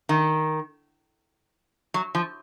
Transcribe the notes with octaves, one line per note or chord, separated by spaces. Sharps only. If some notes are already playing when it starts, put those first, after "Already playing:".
D#3
F#3
F3